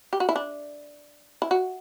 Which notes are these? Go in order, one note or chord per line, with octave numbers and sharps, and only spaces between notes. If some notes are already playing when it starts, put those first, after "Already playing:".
G4
F#4
E4
D4
E4
F#4